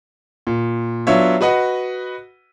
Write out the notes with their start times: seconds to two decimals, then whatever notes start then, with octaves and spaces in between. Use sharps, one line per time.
0.47 A#2
1.07 F#3 B3 D4 F4 C#5 E5
1.41 F#4 B4 D#5 F#5